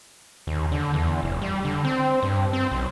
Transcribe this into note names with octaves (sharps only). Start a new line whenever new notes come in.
D#2
D3
E2
F1
G3
D3
C4
G2
C4
B1